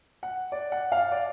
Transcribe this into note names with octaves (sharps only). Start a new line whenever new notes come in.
F#5
D5
F#5
F5
D5